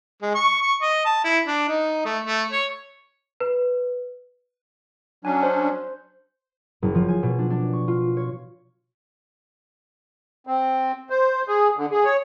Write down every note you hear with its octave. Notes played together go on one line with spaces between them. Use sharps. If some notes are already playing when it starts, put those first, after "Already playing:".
G#3
C#6
C#6
D#5
A5
E4
D4
D#4
A3
A3
C#5
B4
F#3 C#4 D4 G#5
C5
F#1
F3
G#5
B2
D4
D4
C#6
F4
C#5
C4
C5
G#4
D3
G#4
C#5